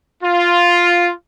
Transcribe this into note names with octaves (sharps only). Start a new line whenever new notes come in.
F4